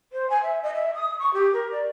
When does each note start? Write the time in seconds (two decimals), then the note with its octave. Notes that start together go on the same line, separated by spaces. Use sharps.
0.12 C5
0.29 G#5
0.43 E5
0.62 D#5
0.74 E5
0.94 D#6
1.19 C#6
1.33 G4
1.53 A#4
1.71 D5